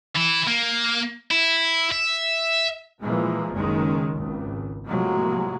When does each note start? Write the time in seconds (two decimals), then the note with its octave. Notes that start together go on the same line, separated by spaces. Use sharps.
0.15 E3 E4
0.47 A#3
1.31 E4
1.92 E5
3.02 A#2 E3 F3 G#3 A#3
3.52 F#1 C#2 D#3 G#3 C#4
4.13 G#1 C#2
4.86 A2 C3 F3 F#3 G#3 A#3